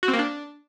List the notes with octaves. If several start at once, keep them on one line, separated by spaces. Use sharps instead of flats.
F#4
C4
A#3
D4